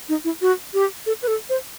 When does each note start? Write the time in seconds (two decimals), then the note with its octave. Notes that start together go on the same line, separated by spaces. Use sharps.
0.09 D#4
0.24 E4
0.42 F#4
0.74 G4
1.06 A4
1.22 B4
1.27 A4
1.49 C5